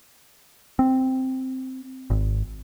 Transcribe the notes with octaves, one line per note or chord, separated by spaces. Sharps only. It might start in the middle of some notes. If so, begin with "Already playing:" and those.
C4
G#1